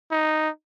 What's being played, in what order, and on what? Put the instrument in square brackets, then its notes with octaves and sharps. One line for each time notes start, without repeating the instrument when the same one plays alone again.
[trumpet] D#4